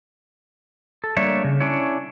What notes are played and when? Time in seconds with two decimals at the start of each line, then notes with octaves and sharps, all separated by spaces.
1.04 A4
1.17 G3 A3 A#3 D4 C#5 E5
1.44 C#3
1.60 C#4 D4 E4 C#5